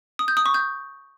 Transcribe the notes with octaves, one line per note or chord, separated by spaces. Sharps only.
D#6
G6
D#6
C#6
G6